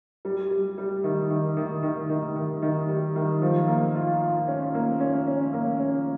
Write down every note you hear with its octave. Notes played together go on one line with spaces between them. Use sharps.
G3
G3
G3
D#3
D#3
D#3
D#3
D#3
D#3
D#3
G3
D#3
F3
A#3
F4
F4
C#4
A#3
C#4
C#4
A#3
C#4